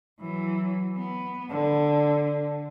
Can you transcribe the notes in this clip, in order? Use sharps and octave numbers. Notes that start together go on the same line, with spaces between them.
E3 F#3
B3
D3